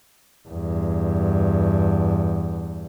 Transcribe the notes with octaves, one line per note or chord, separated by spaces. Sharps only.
E2 G2